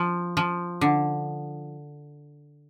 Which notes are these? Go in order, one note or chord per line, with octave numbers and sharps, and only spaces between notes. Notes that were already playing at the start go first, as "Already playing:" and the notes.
Already playing: F3
F3
D3